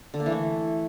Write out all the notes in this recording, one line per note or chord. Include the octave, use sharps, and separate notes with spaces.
D3
A#3
E3
A3